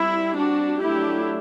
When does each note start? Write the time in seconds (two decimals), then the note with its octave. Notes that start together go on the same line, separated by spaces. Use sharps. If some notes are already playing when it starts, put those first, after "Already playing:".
Already playing: G3 C4 E4
0.35 D4 F#4
0.79 F#3 A3 D4 E4 G4